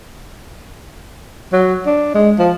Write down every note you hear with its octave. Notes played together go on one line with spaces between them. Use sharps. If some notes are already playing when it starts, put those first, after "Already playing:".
F#3
D4
G#3
F3